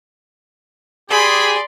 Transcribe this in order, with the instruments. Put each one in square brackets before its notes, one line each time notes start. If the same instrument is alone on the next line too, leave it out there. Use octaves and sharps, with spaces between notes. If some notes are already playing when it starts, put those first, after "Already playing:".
[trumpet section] G4 G#4 [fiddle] D5 C6 [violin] B5